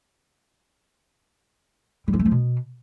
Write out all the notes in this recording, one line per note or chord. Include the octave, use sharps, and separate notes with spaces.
G3
F3
A3
F3
B2